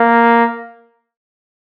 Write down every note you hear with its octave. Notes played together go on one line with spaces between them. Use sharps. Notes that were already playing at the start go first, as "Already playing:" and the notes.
Already playing: A#3